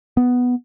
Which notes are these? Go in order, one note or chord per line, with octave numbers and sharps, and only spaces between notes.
B3